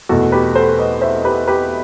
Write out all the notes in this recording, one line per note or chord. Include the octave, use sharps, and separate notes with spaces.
E2 B2 A3 F#4 A4
G4 B4
A4 C5
B4 D#5
C5 E5
G4 B4
G4 B4